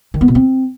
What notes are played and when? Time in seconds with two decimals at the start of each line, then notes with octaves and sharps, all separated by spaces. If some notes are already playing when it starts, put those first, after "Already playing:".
0.14 D#3
0.21 B3
0.28 B2
0.35 C4